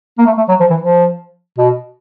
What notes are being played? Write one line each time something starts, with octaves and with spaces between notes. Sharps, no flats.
A#3
A3
A3
F#3
F3
E3
F3
B2